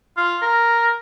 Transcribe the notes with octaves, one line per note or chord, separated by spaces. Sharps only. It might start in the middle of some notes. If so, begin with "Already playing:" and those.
F4
A#4